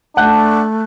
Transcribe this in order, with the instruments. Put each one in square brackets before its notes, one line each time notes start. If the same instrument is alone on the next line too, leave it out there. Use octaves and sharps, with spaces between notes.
[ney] A3 [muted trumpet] D4 [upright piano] F#5 F#6 G6